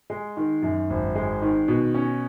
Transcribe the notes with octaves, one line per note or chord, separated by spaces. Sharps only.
G#3
D#3
F#2
G#1
G#3
D#3
B2
C#4